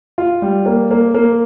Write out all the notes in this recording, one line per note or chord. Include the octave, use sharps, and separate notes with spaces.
F4
G3
A#3
A#3
A#3